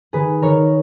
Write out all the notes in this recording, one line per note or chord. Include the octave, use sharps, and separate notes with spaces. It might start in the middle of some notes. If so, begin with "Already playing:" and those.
D#3 G#4 B4
D#3 A#4 C#5